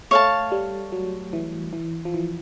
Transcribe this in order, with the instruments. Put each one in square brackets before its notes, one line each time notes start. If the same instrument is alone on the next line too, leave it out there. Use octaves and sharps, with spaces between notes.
[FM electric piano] A3 [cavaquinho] C#5 F5 A5
[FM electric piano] G3
F#3
E3
E3
F3
E3